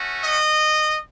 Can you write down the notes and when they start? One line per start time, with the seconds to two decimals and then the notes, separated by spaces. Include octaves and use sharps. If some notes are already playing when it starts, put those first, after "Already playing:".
Already playing: A3 C#4 F#4
0.23 D#5